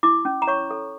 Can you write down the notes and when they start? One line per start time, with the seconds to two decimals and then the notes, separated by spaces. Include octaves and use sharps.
0.03 E4 D6
0.25 C#4
0.42 A#5
0.47 C#5 C#6
0.71 A4